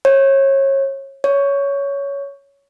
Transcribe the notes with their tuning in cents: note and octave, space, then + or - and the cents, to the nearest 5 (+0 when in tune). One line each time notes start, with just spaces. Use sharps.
C#5 -30
C#5 +10